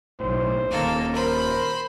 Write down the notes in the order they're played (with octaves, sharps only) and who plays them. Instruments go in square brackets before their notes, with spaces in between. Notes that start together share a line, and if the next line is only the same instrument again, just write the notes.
[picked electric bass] B1 A2 [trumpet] C5
[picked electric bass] D#1 D#2 [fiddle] A#3 A4
[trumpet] A#4 [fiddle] C5 B5